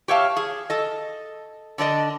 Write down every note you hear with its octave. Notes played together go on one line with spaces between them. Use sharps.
G4 C#5 E5 F5 A5
G#4
A4 D#5
D3 D4 D5 D#5